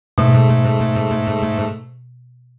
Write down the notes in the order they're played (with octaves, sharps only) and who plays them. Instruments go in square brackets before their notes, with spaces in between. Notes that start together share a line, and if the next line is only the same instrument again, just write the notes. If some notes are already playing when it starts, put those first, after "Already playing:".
[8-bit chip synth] G#2 A3 [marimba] B2